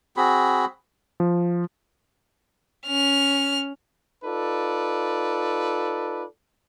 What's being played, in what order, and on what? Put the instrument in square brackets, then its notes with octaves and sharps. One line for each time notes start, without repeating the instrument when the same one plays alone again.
[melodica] C4 F#4 G#4 B5
[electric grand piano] F3
[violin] C#4 F6
[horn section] D#4 F4 A4 B4 D5